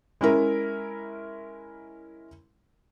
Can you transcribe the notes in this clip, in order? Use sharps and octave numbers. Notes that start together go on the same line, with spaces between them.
G#3 C#4 E4 A#4